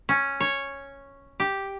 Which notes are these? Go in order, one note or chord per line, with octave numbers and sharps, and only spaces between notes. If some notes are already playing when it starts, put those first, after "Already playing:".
C#4
C#5
G4